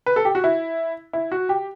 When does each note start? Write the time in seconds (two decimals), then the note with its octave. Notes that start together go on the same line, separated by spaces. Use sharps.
0.06 B4
0.16 A4
0.25 G4
0.35 F#4
0.44 E4
1.13 E4
1.32 F#4
1.49 G4